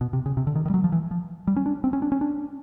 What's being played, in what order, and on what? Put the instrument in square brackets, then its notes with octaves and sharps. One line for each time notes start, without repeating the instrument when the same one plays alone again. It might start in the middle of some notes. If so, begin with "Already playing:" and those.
[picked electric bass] B2
C3
C#3
C3
D3
D#3
D#3
G3
F#3
F3
E3
F3
G3
C#4
D4
C4
C#4
D4
C#4
D4